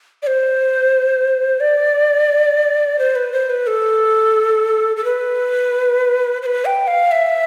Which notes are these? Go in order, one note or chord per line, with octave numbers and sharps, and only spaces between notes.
D5
C5
D5
C5
B4
C5
B4
A4
A4
B4
C5
B4
G5
F5
E5